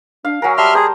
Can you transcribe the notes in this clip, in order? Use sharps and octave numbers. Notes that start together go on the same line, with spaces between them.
D4 F5
F#3 A#4 G#5
G3 E5 A5 C6 F6
G#4 C5 A#5